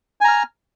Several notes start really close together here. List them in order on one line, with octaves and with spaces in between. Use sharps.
G#5 A#5 F6